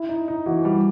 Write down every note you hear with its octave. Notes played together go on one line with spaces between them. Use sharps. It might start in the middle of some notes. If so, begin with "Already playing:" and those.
Already playing: E4
D#4
D#4
E3 F#4
G3